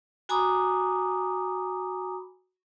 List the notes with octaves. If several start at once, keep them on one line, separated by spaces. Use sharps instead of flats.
F#4 G#5 A#5 B5 D6 D#6